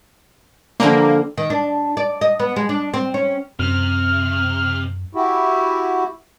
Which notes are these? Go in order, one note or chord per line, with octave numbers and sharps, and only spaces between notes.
D3 F3 G3 A#3
D#3
D4
D5
D#5
B3
G#3
D4
C4
C#4
F#2 C3 F6
E4 F#4 G4